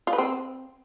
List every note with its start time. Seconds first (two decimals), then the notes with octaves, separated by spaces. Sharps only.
0.07 F4
0.13 B4
0.18 C4